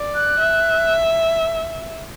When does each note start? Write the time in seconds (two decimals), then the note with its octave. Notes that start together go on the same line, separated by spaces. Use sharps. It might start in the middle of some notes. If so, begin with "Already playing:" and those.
Already playing: D5
0.15 F#6
0.39 E5